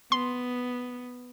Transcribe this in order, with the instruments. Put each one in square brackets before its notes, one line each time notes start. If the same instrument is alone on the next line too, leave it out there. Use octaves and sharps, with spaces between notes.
[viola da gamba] B3 [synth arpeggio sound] C6